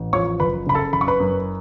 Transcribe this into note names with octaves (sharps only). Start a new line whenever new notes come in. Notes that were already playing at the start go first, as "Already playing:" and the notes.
Already playing: A1
F3 C#5 C#6
F#1 B4 B5
C#3 B5
A4 A5
F#1 B5
C#6
B4 B5
F#2